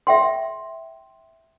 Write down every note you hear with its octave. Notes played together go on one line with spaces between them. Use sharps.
E5 G5 C6